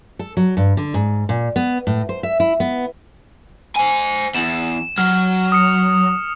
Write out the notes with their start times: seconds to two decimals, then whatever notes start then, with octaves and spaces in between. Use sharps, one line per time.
0.19 A4
0.37 F#3
0.57 G2
0.77 D3
0.94 G#2
1.29 A#2
1.56 B3
1.87 A2
2.09 C5
2.23 E5
2.40 E4
2.60 B3
3.76 C5 G#5
4.34 E2 E7
4.98 F#3 F6
5.52 D#6 C#7